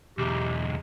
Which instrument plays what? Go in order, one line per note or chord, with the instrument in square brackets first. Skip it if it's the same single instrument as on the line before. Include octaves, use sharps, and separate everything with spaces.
[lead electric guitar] B1 E2 [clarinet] G4